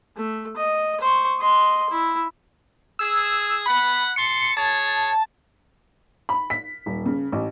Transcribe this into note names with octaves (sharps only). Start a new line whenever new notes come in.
A3
D#5
C5 C#6
D#5 C6
E4
G#4 E6
F#5 B5
A5 C6 C#7
G#4 C#5 A5
B5
B6
D#1
C#3
A1